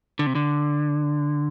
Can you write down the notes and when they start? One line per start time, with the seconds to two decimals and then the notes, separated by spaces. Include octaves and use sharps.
0.19 D3
0.27 C3
0.35 D3